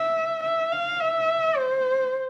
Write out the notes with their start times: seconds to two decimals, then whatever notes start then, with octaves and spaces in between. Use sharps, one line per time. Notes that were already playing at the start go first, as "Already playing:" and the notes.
Already playing: E5
0.43 E5
0.72 F5
1.00 E5
1.56 C5